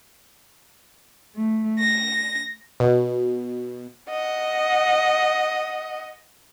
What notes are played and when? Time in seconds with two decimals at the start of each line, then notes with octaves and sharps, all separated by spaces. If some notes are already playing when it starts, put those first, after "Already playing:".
1.35 A3
1.81 A#6
2.80 B2
4.10 D#5 F#5